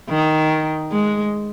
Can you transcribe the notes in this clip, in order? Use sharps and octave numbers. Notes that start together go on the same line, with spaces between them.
D#3
G#3